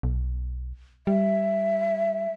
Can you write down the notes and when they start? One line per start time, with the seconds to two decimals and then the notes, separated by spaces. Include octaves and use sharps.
0.03 B1
1.07 G3 E5